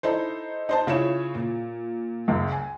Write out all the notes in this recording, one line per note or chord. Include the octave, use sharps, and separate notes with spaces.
D#4 E4 A4 C5
D#4 C5 A5
C#3 E4 F4 C#5 E7
A#2
F#1 C#2 F#2
G#5